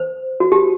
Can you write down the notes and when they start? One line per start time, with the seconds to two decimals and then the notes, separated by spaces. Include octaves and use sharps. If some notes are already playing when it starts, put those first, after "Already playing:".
Already playing: C5
0.40 F#4
0.52 G4